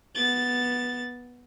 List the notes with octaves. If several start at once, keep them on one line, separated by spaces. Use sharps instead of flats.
B3 A6